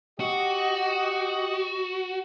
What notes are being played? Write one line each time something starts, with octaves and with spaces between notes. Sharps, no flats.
F#4 G4 D#5